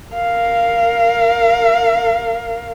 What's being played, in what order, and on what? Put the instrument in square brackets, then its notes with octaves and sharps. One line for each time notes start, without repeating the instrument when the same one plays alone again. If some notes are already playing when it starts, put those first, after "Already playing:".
[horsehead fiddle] A#4 F5